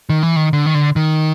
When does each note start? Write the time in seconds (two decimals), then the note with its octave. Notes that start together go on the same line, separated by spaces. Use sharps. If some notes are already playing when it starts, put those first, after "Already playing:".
0.10 D#3
0.23 E3
0.36 D#3
0.53 D3
0.66 D#3
0.74 D3
0.96 D#3